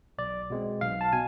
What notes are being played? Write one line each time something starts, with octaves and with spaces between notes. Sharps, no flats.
B1 D5
B2 G#3 C4
B1 F5
A5
B2 G#5